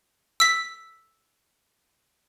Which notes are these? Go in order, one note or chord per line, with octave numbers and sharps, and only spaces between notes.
E6 B6